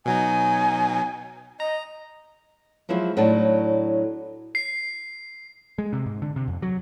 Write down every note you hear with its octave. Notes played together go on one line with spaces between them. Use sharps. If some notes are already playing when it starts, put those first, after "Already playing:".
B2 F#3 D#4 G#5
D#5 A#5
F3 F#3 G#3 E4 F4 C5
A2 F#3 D4 D#4 A5
C7
G#3
C3
G#2
D3
C3
F2
F#3